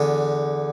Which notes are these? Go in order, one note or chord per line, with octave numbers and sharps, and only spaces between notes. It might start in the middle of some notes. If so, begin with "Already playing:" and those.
Already playing: E2 D3